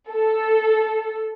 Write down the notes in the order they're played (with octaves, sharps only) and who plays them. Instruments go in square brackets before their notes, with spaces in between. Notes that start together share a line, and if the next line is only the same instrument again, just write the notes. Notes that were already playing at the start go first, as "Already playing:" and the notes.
[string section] A4